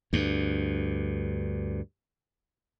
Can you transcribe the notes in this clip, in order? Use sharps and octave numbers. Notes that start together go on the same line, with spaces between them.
D2 G2